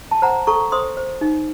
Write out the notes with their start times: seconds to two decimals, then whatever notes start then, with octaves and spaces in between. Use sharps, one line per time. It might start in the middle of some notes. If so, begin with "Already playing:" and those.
0.11 A5
0.22 C5 F#5 A#5
0.47 A4 A#5 C#6
0.72 C5 C6 D#6
0.97 C5
1.21 D#4